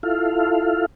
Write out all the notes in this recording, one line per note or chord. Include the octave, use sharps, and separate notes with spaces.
E4 F4 A4 F5